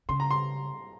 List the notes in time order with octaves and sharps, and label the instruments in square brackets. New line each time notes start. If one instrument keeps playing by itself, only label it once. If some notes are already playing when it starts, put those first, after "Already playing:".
[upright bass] C#3 [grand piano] C6
[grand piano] A#5
C6